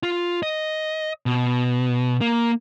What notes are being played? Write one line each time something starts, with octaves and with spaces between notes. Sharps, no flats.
F4
D#5
B2
A#3